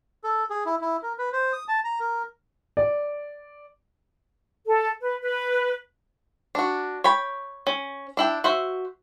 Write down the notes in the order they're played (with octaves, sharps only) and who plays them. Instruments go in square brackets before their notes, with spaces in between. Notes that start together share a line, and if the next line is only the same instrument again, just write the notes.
[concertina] A4
G#4
E4
E4
A#4
B4
C5
D#6
A5
A#5
A#4
[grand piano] D5
[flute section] A4
B4
B4
[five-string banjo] D4 F#4
C#5 G5 B5
C#4
D4 E4 G5
F#4 C5 E5